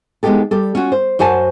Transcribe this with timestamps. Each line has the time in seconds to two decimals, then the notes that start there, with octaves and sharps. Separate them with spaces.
0.23 G#3 B3 D#4 F#4 G4 A4
0.51 G3 G4 A4
0.75 C#4 F4 F#4
0.92 C5
1.19 F#2 F#4 C5 G#5 A5